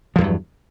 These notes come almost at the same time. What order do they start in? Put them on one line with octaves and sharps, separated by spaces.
F3 E2 G2 F#3